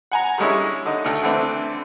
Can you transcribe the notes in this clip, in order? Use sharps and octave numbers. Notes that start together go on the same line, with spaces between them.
F#5 G#5 A#5
D3 G3 G#3 C#4 E4
D3 D#4
D2 A3
D3 E3 A3 C4 D4